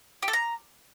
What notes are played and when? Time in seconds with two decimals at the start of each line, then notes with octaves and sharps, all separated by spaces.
0.22 G4
0.28 A4
0.33 A#5